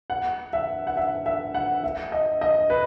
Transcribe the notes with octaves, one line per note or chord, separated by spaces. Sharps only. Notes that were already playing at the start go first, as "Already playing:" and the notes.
F#5
E5
F#5
E5
E5
F#5
E5
D#5
D#5
B4